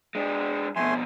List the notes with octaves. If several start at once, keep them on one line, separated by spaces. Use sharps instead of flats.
G#3 D4
F2 B2 A3 G#5 C6